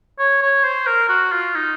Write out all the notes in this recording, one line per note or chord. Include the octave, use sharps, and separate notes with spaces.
C#5
C#5
C5
A#4
F#4
F4
D#4